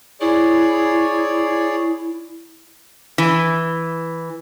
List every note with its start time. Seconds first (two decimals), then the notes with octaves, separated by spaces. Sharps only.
0.21 E4 G#4 C#5 D5
3.18 E3